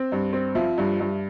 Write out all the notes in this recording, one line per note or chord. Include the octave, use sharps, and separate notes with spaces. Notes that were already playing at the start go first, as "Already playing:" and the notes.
Already playing: C4
G2
C4
F3 E5
G2
G2